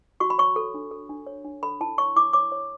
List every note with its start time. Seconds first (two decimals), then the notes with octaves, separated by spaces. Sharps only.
0.20 F#4 C#6
0.30 B5
0.38 C#5 C#6
0.56 A4
0.74 D4
0.91 A4
1.09 D4
1.27 C#5
1.45 D4
1.63 A4 B5
1.81 E4 A5
1.98 C#5 C#6
2.16 E4 D6
2.33 C#5 D6
2.52 C#5